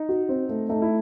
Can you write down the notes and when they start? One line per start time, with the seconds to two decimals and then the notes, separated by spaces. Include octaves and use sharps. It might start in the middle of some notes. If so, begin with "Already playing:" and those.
Already playing: D#4
0.09 F#4
0.29 C4
0.49 A3
0.69 A3 D#4
0.82 E4